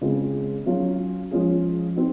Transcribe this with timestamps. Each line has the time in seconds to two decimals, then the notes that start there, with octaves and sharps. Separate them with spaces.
0.01 C#3 G#3 C4 F4
0.66 F#3 C#4 F4
1.31 F3 G#3 C#4 F4 G#4
1.96 C4 D#4 F#4